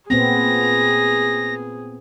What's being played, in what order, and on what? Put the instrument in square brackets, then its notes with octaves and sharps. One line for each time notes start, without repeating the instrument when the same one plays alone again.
[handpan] A#2 B3 C4 [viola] G#4 [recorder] A#6